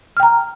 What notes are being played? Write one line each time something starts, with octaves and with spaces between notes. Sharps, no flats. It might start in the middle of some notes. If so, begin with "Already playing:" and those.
G5 A#5 F6